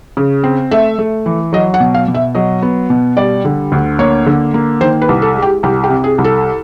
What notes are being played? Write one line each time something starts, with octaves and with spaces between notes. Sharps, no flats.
C#3
C4
A3 E5
A3
E3
F#3 D#5
F#5
B2
F5
B2
E5
F#3 D#5
B3
B2
G3 D5
D3
D2
A#3 C#5
D3
A#3
D#3 C5
B4
C2
A4
G#3
G4
C2 G4
G4
C3
G#4
C2
A4